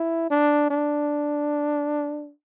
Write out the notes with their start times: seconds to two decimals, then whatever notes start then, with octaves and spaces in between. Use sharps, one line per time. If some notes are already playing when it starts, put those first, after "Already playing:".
Already playing: E4
0.30 D4
0.70 D4